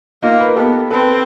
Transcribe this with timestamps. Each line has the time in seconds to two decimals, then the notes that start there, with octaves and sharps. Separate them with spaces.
0.22 A#3 D#4 F4
0.40 B4
0.48 A#4
0.56 B3 G4 A4
0.90 C4 A4 B4